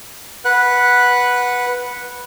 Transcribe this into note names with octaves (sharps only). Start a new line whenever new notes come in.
B4 F#5 F#6